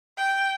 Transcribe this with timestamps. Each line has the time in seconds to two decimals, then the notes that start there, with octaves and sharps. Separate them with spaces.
0.18 G5